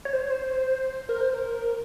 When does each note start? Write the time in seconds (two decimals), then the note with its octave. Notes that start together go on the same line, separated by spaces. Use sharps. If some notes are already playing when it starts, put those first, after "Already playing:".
0.05 C#5
0.13 C5
0.22 C#5
0.30 C5
1.09 A#4
1.21 C5
1.34 A#4